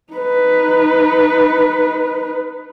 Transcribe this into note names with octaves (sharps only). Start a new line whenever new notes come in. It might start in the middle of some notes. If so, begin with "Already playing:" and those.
D#4 B4